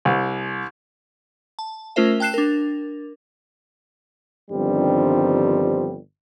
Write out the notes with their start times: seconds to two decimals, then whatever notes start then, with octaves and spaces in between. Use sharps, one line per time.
0.05 C2
1.59 A5
1.96 A3 C#4 F4 A#4 C5 E5
2.20 G5 A5 F#6 C7 E7
2.34 D4 A#4
4.51 G1 G2 D#3 F3 G3 C4